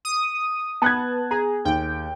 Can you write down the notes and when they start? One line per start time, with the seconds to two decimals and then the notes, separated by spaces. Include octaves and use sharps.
0.05 D#6
0.82 B3 A5 F#6 G#6
1.31 G#4 A#5
1.65 D#2 G5